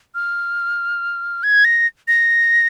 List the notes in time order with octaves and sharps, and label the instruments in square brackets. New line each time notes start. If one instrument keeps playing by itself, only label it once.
[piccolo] F6
G#6
A#6
A#6